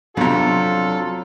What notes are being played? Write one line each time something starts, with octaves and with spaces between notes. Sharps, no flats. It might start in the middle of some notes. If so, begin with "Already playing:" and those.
F2 C3 F#3 D4 F4 A4